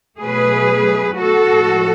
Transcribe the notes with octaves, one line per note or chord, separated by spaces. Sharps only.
B2 F#3 A3 G#4 B4
F#4 A4
A2 F3 G#3